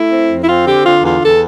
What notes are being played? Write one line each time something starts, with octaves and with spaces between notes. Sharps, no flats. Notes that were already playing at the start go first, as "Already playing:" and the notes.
Already playing: A3 E4
C4
F2
E4
C4 F4
D3 G4
D3 F4
E2 F4
E2 A4